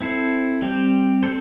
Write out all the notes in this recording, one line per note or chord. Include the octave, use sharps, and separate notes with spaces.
C4 E4 A4 C5
G3 C4 G4 C5
C4 A4 C5